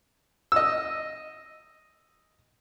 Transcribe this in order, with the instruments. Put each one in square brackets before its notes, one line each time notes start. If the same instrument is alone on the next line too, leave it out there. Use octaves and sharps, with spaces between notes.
[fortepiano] D#5 E6